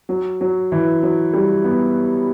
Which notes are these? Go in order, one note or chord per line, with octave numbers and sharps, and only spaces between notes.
F#3
F#3
E3
F#3
G3
B3